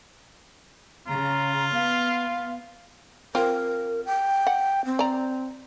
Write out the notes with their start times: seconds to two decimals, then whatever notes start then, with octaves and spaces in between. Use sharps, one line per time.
1.08 C#3 F4 A#5
1.74 B3 F5
3.35 C4 F4 A#4
4.06 G5
4.47 F#5
4.85 C4
4.99 D5 A#5